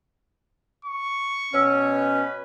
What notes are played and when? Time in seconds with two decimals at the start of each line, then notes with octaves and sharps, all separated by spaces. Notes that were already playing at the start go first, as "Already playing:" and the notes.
0.85 C#6
1.54 B2 C#4 C#5 E6
1.91 B4